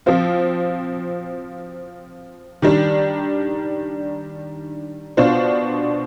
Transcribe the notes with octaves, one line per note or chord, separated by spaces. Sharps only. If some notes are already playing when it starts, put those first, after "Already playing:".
F3 C4 F4
D#3 G3 D4
B2 B3 D4 F4 C5